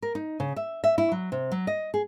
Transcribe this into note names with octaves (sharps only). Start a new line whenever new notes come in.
A#4
D#4
C#3
E5
E5
E4
F#3
C3
F#3
D#5
G#4